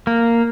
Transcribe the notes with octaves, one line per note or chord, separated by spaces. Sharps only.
A#3